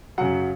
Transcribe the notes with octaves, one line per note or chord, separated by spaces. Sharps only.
F#2 C#3 F#3 F#5